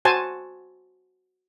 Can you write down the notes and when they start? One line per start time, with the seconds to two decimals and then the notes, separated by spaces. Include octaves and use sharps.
0.05 F#4 C5 G#5 A5